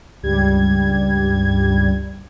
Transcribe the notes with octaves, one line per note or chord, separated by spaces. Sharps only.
C#2 G2 G3 G#6